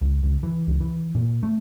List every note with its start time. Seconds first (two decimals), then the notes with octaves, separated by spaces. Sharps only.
0.01 C#2
0.23 C#2
0.43 E3
0.67 C#2
0.80 E3
1.15 A#2
1.43 A3